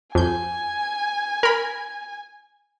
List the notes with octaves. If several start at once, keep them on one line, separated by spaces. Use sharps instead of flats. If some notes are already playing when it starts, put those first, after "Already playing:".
F2 G#5 G6
A#4 B5